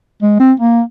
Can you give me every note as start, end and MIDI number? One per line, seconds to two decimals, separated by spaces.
0.23 0.36 56
0.40 0.53 60
0.60 0.82 58